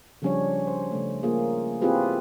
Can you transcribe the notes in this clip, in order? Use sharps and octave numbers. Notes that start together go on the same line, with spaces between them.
C#3 F3 G3 C#4 D4 C#5
C5
C#3 A3
A#3 F4 G#4
C4 E4 F4 G4 G#4 B4